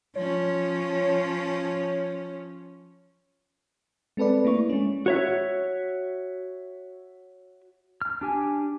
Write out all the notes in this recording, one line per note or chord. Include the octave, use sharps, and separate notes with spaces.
F3 C#4 C#5
G#3 C4 A4 B4 D5
A3 A#3 E4 C#6
G#3 C#4
F#4 C#5 E5
F6
D4 G4 G#5